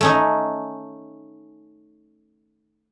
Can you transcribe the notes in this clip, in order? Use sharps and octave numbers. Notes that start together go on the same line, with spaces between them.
A3 C#4 D#4